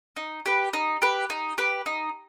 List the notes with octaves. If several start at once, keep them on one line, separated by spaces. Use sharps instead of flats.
D#4
G4 B4
D#4
G4 B4
D#4
G4 B4
D#4